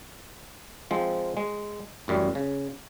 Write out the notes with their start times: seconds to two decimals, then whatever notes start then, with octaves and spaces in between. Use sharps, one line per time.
0.91 F3 G#3 C4
1.37 G#3
2.08 A1 F#2 G3
2.35 C#3